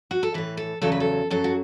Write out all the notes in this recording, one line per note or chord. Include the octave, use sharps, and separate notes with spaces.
F#4
A4
A2 E3 B4
A4
E2 C#3 F#3 A4
B4
A4
F#2 F#3 A4
F#4